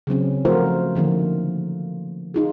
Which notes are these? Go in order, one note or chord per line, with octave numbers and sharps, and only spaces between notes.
C#3 F#3 C4 C#4
F3 A3 F4 F#4 A#4 C5
D3 D#3 F3 A#3
D#4 F4 G#4